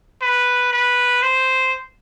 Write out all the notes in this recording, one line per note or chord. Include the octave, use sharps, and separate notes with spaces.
B4
B4
C5